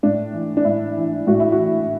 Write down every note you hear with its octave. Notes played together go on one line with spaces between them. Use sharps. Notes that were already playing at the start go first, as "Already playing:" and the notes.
A2 D4
E3
D4
A2 E4
E3
A2 F#4
E4
F#4
E3